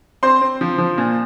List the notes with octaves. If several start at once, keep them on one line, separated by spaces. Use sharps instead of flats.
C4 C5 C6
C4
F3
F3
A#2